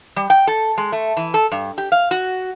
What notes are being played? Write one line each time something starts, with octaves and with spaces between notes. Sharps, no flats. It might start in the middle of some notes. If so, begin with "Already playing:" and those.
G3
G5
A4
G#3
A3
E3
A4
G2
G4
F5
F#4